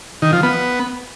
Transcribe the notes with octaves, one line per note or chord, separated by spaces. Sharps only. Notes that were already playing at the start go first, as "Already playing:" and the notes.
D#3
F3
B3